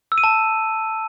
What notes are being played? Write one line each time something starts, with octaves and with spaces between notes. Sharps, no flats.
E6
D#7
A5